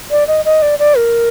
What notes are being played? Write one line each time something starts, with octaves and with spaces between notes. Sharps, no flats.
D5
D#5
D#5
D5
D5
A#4